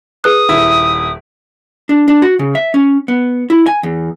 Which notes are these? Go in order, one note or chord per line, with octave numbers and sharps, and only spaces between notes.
G#4 B4 D#6 F#6
D#1 E4 E5
D4
D4
F#4
C#3
E5
C#4
B3
E4
G#5
E2